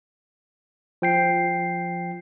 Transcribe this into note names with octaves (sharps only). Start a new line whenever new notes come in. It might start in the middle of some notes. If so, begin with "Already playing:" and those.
F3 G5 C7